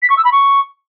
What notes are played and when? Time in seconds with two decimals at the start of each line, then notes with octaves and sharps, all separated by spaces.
0.03 B6
0.10 C#6
0.17 E6
0.25 B5
0.32 C#6